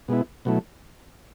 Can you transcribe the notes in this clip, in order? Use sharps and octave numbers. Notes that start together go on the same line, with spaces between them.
B2 G#3 B3 E4
B2 F#3 A3 E4